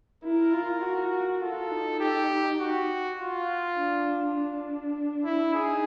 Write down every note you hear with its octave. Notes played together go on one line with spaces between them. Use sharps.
E4 A#4
F4
F#4
F4 A4
D#4
G4
F#4
F4
D4
D4
E4
D#4 G#4